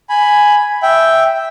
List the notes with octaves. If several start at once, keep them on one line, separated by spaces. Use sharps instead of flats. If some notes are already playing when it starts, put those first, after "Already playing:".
G#5 B5
E5 G5